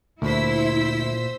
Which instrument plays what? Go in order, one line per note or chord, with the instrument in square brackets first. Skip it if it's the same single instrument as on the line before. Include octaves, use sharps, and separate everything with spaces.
[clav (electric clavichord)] D2 [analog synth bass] A#2 [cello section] E4 [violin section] C5 E6 B6